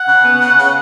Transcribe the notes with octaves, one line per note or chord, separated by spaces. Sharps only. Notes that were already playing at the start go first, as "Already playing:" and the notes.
Already playing: F#5
C#3
B3
C#3
C#3